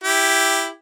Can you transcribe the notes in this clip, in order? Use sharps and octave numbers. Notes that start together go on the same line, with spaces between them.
E4 G4